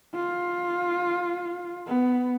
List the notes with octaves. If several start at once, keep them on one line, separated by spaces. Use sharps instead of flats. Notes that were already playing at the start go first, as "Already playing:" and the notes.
F4
B3